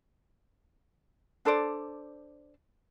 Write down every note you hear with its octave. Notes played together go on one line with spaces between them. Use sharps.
D4 A4 C5 D5